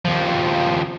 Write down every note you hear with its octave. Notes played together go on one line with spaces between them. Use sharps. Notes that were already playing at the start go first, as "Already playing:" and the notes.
D#2 F3